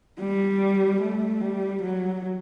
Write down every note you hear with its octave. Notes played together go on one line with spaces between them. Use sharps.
G3
A3
G3
F#3